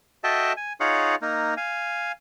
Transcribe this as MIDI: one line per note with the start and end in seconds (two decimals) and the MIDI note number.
0.24 0.53 66
0.24 0.53 69
0.24 0.53 75
0.24 0.53 76
0.24 0.53 79
0.24 0.53 81
0.57 0.73 80
0.80 1.15 63
0.80 1.15 65
0.80 1.15 68
0.80 1.15 73
0.80 1.15 77
0.80 1.15 78
1.22 1.54 58
1.22 1.54 63
1.57 2.12 77
1.57 2.12 80